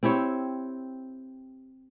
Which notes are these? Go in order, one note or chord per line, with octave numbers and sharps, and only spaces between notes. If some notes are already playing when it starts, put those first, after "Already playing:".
C4 E4 G4 C#5